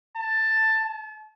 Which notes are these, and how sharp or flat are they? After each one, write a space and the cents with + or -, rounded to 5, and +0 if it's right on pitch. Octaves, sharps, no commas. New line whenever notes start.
A5 +10
A5 -35